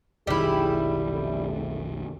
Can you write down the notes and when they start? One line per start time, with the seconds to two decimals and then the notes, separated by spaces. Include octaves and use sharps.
0.27 F1 B1 D#3 G3 E4 G4 G#4
1.09 F2 C#3 A3